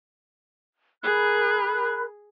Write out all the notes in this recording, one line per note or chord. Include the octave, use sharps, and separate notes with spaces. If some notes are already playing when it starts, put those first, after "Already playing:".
G#4 A#4 B5 F#6